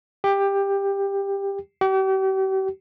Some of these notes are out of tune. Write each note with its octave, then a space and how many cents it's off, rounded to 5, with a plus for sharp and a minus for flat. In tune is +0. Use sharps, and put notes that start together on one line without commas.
G4 +15
G4 -40